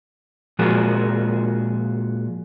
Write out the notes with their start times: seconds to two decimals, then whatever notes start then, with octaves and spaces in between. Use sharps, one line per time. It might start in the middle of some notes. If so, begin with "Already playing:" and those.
0.59 A#2 F3 G#3 F#4 G#4